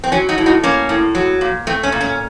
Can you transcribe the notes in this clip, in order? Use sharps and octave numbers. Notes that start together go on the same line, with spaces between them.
C4
F#3 C#4
D#4 F#4
A2
D#4 F#4
A#3 C#4
A2
F#3
A#2
A3 C4
C#4
A#2
C#4